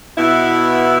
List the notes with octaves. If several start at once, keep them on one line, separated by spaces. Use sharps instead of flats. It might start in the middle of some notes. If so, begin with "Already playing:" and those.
B2 B3 E4